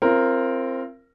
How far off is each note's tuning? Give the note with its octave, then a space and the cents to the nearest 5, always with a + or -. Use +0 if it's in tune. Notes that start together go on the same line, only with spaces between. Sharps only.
C4 +10 F4 -35 A#4 +0